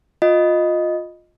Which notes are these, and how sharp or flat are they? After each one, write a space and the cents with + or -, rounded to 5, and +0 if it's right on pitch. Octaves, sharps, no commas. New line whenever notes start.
F4 +20 D#5 +0